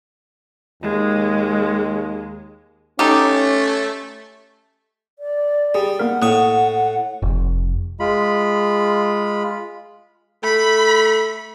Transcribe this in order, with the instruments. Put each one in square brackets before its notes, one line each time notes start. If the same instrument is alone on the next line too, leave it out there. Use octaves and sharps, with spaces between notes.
[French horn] D#2 [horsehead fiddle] G#3
[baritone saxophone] A3 [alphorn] C#4 [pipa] D#4 G4
[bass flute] D5
[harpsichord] G3 [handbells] G4 G#4
[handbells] A#3 B3 A#4 [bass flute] F#5
[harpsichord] A2 C#6 [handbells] A#3 D#6 F#6
[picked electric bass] F1
[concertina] G#3 F4 B5
[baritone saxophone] A3 [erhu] B5